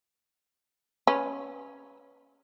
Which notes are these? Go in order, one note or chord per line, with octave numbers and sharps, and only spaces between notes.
C#4 B4